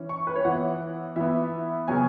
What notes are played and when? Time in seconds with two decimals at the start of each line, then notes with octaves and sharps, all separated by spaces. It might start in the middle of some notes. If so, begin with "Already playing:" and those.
Already playing: E3 C#4
0.09 C#6
0.27 B4
0.36 C#5
0.45 E3 B3 F#5
1.16 E3 B3 E5
1.88 C#3 F#3 B3 G#5